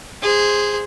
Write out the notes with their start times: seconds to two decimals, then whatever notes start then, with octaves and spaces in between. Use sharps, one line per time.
0.22 G#4 C5